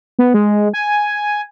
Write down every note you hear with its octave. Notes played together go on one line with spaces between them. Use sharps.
B3
G#3
G#5